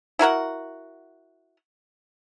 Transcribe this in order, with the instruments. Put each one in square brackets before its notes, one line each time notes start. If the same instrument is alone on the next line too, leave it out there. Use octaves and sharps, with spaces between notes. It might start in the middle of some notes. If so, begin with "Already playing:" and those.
[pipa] E4 F#4 A#4 F#5